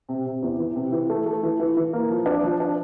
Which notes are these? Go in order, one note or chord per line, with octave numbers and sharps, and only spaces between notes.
C3
C3
E2
E3
C3
E3
A3
A3
E3
E3
E3
A#3
F3
D4
F3
D4